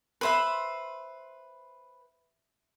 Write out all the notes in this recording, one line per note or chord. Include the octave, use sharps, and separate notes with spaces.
B4 C5 E5 B5 C6